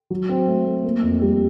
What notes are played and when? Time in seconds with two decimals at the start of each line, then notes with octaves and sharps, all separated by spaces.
0.10 F#3
0.29 C4
0.47 A3
0.65 A3
0.84 A#3
1.02 F2
1.22 G3